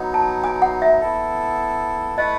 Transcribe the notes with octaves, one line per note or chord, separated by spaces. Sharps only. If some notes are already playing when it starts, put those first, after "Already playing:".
Already playing: F#3 B3 D#4
A5
G#5
F#5
E5
B3 E4 A4
A3 E4 B4 D#5 F#5